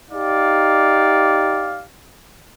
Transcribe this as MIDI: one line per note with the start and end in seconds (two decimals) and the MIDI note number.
0.11 1.84 63
0.11 1.84 67
0.11 1.84 74
0.11 1.84 77